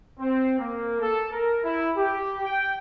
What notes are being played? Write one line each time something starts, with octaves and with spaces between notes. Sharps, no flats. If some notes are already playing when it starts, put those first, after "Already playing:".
C4
A#3
A4
A#4
E4
G4
G5